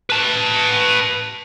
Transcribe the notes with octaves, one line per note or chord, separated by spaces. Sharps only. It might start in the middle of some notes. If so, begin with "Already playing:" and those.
B4 A5